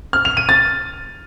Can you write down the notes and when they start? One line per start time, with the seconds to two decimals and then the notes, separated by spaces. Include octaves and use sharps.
0.13 F6
0.25 F7
0.37 D#7
0.49 A6